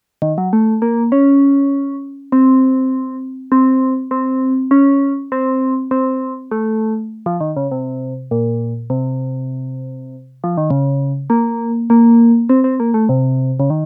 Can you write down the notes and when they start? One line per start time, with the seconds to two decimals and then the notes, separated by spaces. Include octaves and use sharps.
0.22 D#3
0.38 F#3
0.53 A3
0.82 A#3
1.12 C#4
2.32 C4
3.52 C4
4.11 C4
4.71 C#4
5.32 C4
5.91 C4
6.51 A3
7.26 F3
7.41 D#3
7.56 C#3
7.71 C3
8.31 A#2
8.90 C3
10.44 F3
10.57 D#3
10.70 C#3
11.30 A#3
11.90 A#3
12.49 C4
12.64 C4
12.80 A#3
12.94 A3
13.09 C3
13.60 C#3
13.70 D#3